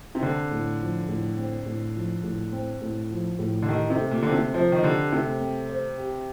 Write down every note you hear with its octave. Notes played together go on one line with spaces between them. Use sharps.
C3
D3 C4
A2
F3
A2
C4
A2
F3
A2
C4
A2
F3
A2
D3
D#3 G4
C3
A3
A#2
D3 C4
C3
F3 C5
D#3
D3 G4
C3 A3
C4
C5
G4